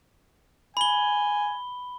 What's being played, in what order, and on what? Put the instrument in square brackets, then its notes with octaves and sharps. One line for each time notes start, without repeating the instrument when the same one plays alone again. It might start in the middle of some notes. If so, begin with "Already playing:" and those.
[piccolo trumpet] G#5 [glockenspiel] B5 G7